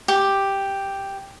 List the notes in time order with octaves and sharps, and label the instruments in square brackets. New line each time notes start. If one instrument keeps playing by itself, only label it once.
[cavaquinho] G4